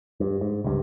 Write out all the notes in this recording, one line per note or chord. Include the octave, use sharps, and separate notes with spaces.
G2
G#2
C#2 G2